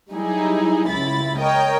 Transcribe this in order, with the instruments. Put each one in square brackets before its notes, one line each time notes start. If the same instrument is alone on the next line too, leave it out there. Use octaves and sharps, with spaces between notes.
[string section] F#3 G3 D#4 E4 G#4
C#2 E4 B5 A6
A#4 C#5 D#5 G5